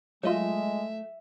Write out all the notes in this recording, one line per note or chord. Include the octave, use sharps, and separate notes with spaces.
F#3 G#3 A3 F4 D#5 E5